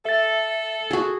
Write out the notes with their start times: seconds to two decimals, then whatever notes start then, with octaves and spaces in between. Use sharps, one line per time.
0.05 A4 E5 A6
0.91 F#4 G#4